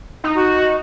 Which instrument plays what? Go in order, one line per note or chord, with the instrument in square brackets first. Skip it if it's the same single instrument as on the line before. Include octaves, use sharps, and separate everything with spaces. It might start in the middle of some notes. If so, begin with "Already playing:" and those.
[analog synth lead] D#4
[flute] F#4